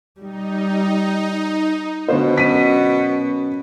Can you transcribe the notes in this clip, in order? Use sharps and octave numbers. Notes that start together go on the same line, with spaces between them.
G3 D#4
B2 D3 B3 C5
F#2 B6 D#7